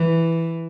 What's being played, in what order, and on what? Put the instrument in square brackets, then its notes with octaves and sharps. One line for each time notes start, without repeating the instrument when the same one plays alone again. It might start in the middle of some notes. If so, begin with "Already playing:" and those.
Already playing: [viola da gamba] E3